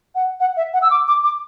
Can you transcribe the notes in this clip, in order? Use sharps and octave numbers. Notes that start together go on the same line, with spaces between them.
F#5
F#5
E5
F#5
E6
D6
D6
D6